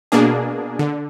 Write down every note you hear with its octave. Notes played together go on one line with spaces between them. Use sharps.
B2 A#3 D4 G#4
D3